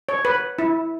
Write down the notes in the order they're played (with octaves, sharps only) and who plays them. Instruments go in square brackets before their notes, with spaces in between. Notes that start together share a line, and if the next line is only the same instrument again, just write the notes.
[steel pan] C#5
B4
E4